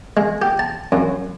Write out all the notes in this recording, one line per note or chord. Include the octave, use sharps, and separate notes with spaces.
G#3
G4
A5
F#2